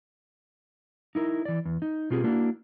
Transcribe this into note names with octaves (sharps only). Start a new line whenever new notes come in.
D#4 E4 A#4
E3 D5
E2
D#4
B2 C4 F4 G4 G#4
A#3 D4 E4 F#4